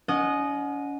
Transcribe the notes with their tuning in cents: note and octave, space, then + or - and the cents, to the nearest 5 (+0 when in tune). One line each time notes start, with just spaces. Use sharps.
C#4 +35 D#5 -10 F#5 -10